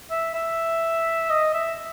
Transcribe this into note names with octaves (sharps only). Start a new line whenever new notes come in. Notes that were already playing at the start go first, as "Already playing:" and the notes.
E5
E5
D#5
E5